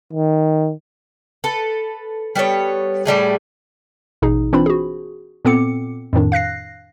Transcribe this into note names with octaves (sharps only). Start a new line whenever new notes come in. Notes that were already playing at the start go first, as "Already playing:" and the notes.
D#3
A4 B4
G3 B3 A4 C#5
A2 G3 A3 G#4
A1 B2 D#4 G#4
E3 C4 D4 F4 C5 B5
F#4 G#4
A#2 B3 C4 A4 D6 C#7
F2 A2 D#3 D4
F5 F#6 A#6 C7